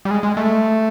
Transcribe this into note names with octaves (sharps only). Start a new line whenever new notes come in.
G3
G#3
G#3
A3